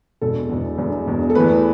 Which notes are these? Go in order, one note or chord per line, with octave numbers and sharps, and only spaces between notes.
E1 E2 B2 A4
E1 E2 B2
E1 E2 B2
E1 E2 B2
A4
E2 E3 A3 B4